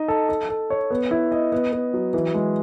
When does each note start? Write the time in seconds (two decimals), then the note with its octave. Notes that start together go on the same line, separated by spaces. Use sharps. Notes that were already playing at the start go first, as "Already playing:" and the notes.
Already playing: D#4 D#5
0.08 A4
0.29 A4
0.49 A4
0.70 C#5
0.90 B3
1.11 E4
1.32 D#5
1.52 B3
1.72 B3
1.93 F#3
2.14 E3
2.34 G#3